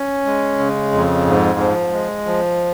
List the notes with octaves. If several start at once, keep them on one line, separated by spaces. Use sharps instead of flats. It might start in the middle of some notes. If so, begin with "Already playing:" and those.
Already playing: C#4
G#3
C#3
F2
G#2
F3
G#3
F3